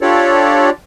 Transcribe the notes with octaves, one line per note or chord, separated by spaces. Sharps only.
D4 F4 G4 A4 C#5 D5